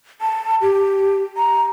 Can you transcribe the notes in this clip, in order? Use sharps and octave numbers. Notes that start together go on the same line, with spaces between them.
A5
G4
A#5